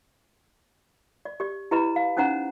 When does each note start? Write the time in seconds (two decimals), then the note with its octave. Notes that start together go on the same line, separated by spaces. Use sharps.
1.25 D5
1.40 G4 D5
1.71 E4 G4 B4 D#5 A#5 B5
1.96 F5
2.17 C#4 D#4 C5 F#5 A#5